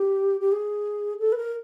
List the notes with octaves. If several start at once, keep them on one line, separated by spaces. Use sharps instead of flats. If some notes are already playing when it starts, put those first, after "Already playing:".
Already playing: G4
G4
G#4
A4
B4
A#4